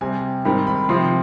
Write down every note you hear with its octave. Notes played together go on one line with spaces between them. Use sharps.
C3 G3 C4 G#5
G#2 D#3 G3 C4 B5
B5
C3 F3 C4 C6